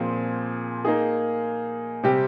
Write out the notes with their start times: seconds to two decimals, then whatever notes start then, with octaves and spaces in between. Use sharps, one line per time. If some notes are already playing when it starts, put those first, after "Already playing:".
Already playing: A#2 F3 C4 F4 G#4
0.85 A#3 D#4 G#4
2.03 C3 G3 C4 G4